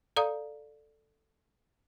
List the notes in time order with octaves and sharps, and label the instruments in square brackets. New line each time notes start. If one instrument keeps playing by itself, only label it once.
[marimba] A4 D5 F5 A#5 D#6